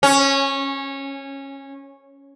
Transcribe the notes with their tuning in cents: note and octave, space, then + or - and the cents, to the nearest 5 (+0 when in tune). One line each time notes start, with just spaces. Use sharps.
C#4 -15